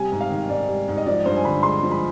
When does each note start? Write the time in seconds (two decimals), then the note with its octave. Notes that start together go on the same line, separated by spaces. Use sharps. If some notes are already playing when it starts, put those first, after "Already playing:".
Already playing: C3 G3 G#5
0.12 G#2
0.21 F5
0.30 D#3
0.49 G#2 D5
0.68 G3
0.88 G#2
0.97 D#5
1.06 F3 D5
1.26 G2 C5
1.36 G#5
1.45 D3 B5
1.63 G#3 C6
1.83 F3
1.91 B5